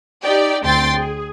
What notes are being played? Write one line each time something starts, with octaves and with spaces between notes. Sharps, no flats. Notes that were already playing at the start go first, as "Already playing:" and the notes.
D#4 G4 D5 G5
D2 C4 G5 C6 A6
G#4